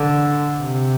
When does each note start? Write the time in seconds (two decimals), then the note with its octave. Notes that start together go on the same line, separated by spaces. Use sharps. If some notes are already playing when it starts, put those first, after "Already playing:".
Already playing: D3
0.60 C3